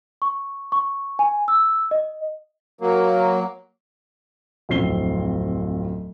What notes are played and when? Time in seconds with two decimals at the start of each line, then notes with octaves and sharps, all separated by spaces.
0.22 C#6
0.72 C#6
1.19 G#5
1.48 E6
1.91 D#5
2.81 F#3 A#3
4.69 D1 F2 C4 C7 G7